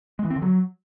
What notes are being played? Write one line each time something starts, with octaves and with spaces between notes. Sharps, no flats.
G#3
E3
C4
D3
F#3